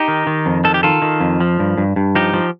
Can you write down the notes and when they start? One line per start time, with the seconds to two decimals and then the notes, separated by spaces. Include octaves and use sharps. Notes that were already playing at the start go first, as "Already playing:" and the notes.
Already playing: D#4 G4
0.08 D#3
0.27 D#3
0.46 F2
0.64 D#3 A4
0.74 G4
0.83 D#3 F4 A4
1.02 D#3
1.20 F2
1.40 F3
1.59 G2
1.77 G2
1.96 G2
2.15 F3 D#4 G4
2.33 F3